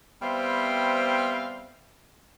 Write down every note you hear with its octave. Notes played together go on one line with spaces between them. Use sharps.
G3 B3 C4 C5 E5 F5